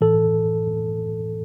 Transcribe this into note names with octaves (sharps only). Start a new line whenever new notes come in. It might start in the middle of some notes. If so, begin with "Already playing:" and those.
A2 E3 A4